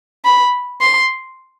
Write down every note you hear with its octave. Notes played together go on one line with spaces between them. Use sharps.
B5
C6